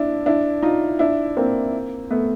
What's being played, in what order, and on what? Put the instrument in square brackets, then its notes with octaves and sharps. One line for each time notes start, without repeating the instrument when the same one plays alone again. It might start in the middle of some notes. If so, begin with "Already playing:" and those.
Already playing: [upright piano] D4 E4
D4 E4
D#4 F4
D4 E4
A#3 C4
A3 B3